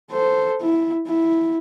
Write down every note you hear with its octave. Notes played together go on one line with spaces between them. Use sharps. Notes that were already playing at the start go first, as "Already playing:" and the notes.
A4 C5
E4
E4